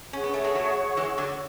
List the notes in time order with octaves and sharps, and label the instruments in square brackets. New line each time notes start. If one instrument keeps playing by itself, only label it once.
[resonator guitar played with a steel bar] C#4 [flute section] G#4 C#5 F#5 C#6
[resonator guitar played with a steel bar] B3
A3
G#3 B3
F#3 A3
E3 G#3
D3 F#3